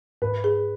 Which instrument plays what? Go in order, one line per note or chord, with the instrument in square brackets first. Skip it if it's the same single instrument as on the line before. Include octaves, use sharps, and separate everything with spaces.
[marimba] G#2 [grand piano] B4
[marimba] G#4